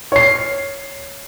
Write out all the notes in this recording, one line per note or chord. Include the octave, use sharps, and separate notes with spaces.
C#5 C7